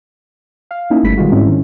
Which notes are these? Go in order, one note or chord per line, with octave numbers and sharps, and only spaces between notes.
F5
A#3 C#4 D#4 E4
G1 G3 A3 B5 B6
B2 D#3 G3 G#3 F4 F#4
G#2 G#3 C4 C#4 E4
D#3 C#4